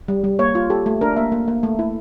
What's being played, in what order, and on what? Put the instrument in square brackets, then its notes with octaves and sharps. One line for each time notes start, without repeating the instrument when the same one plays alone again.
[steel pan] G3
G3
A#3 C#5
F4
G4 A4
A3
D4 A#4
A#3 E5
A#3
A#3
A3
E4